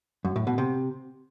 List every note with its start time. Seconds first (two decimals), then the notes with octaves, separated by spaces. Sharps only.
0.25 F#2
0.36 A2
0.47 B2
0.58 C3